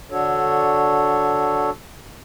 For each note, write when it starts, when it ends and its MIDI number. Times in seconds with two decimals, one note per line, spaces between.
0.11 1.70 50
0.11 1.70 62
0.11 1.70 66
0.11 1.70 69
0.11 1.70 73